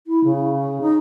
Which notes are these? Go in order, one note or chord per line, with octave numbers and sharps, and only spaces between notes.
E4
C#3
D#4